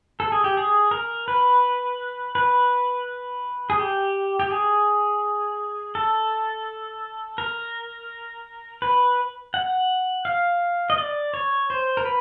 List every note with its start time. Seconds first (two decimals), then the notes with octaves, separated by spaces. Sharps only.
0.20 A4
0.32 G#4
0.44 G4
0.57 G#4
0.91 A#4
1.28 B4
2.35 B4
3.70 G#4
3.79 G4
4.39 G4
4.51 G#4
5.95 A4
7.38 A#4
8.82 B4
9.54 F#5
10.25 F5
10.90 D#5
10.98 D5
11.34 C#5
11.70 C5
11.97 A#4
12.05 B4